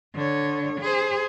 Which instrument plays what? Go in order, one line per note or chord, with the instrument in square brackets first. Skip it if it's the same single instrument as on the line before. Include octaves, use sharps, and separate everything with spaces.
[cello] D3 C#5
G#4 C5